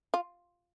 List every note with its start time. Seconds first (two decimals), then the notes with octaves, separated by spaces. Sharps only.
0.14 F4